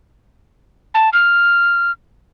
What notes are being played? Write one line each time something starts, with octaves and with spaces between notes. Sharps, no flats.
A5
F6